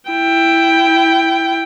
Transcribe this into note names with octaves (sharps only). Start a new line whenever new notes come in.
E4 G5